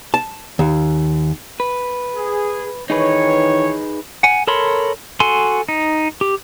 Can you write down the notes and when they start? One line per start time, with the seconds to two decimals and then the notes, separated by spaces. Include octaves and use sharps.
0.14 A5
0.59 D#2
1.60 B4
2.16 G#4
2.90 D#3 E3 D#4 G#4 B4 C#5
4.23 F#5 G#5
4.47 A4 A#4 C#5 B5 C6
5.20 F#4 A4 G#5 C6
5.69 D#4
6.21 G4